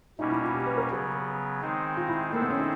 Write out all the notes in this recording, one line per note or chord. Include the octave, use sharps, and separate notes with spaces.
B2 G3 A#3 C#4 D#4
E4
F4
G4
B4
A#4
C#3 F#3 B3 G#4
D#3 G#3 C4 D#4
F4
E4
D#3 G#3 A#3 C4 E4 A4
B3
C#4
D#4